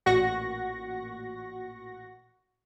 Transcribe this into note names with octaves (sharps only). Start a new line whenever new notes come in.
A1 A#2 F#4 F#5 C#6 A#6